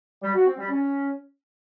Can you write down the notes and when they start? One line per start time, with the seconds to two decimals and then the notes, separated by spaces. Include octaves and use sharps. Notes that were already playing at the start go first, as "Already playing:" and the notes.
0.22 G3
0.34 F#4
0.46 C4
0.58 G3
0.70 C#4